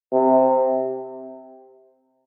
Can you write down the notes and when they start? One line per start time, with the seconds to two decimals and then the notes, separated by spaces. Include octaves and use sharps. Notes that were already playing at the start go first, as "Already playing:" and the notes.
0.13 C3